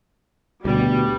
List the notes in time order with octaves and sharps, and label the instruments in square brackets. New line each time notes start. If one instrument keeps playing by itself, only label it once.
[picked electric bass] D2 B2 [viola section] G3